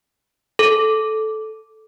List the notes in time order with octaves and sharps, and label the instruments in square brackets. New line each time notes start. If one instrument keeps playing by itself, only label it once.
[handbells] A4